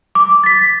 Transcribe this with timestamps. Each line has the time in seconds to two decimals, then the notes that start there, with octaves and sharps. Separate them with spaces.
0.15 D6
0.44 A6 B6